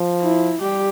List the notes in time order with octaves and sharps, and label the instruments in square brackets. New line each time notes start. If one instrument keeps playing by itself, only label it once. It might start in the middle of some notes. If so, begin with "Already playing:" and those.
Already playing: [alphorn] F3
[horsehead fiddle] E4
[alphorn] G3 [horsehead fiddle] G4